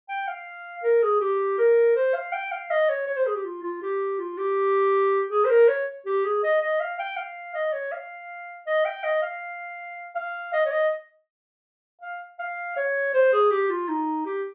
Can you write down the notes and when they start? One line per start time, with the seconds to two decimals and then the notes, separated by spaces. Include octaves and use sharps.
0.09 G5
0.28 F5
0.84 A#4
1.02 G#4
1.20 G4
1.58 A#4
1.95 C5
2.14 F5
2.32 G5
2.51 F5
2.70 D#5
2.89 C#5
3.07 C#5
3.16 C5
3.26 G#4
3.35 G4
3.44 F4
3.63 F4
3.82 G4
4.19 F4
4.38 G4
5.30 G#4
5.44 C5
5.49 A#4
5.68 C#5
6.06 G4
6.24 G#4
6.43 D#5
6.62 D#5
6.80 F5
6.99 G5
7.17 F5
7.55 D#5
7.73 C#5
7.92 F5
8.67 D#5
8.85 G5
9.03 D#5
9.22 F5
10.15 F5
10.53 D#5
10.65 C#5
10.71 D#5
12.01 F5
12.39 F5
12.76 C#5
13.14 C5
13.32 G#4
13.51 G4
13.70 F4
13.88 D#4
14.26 G4